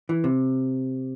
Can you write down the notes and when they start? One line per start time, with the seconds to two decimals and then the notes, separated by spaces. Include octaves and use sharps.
0.09 E3
0.24 C3